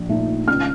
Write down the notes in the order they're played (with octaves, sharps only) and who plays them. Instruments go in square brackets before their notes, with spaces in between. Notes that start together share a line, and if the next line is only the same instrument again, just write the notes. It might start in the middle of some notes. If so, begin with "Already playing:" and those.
Already playing: [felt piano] A#1
A#2 A3 D#4
C#2 F6